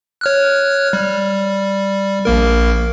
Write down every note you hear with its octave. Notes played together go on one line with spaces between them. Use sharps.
C#5 F6 F#6
G3
A#1 A#3 A#4